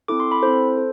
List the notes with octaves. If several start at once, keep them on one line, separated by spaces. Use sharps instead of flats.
C4 E4 A4 D6
C6
B5
C4 E4 A4 C5
A4